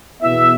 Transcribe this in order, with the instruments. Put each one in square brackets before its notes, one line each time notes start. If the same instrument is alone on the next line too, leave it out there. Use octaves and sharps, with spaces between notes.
[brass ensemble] E2 B2 B3 E4 E5